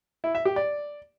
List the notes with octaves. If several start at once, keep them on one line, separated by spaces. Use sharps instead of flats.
E4
E5
G4
D5